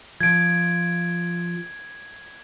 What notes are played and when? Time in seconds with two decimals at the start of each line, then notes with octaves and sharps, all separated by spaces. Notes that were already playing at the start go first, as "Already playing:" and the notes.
0.21 F3 F4 G#6 D7